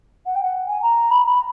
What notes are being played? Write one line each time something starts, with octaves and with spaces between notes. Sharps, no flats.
F#5
G5
F#5
G#5
A#5
B5
B5